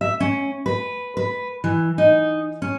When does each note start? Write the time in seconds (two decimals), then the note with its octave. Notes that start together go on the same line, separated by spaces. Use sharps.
0.01 E5
0.20 C#4
0.66 B4
1.17 B4
1.64 E3
1.98 D#4
2.62 C#4